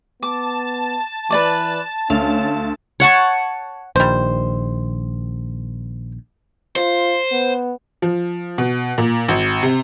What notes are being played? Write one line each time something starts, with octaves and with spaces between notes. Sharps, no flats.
B3 A5 D6
E3 B4 D5 D6
D2 C#4 F5
C#5 F#5 A5 C#6
A#1 D#3 G3 C5
F4 C5
B3
F3
B2
A#2
G#1
C3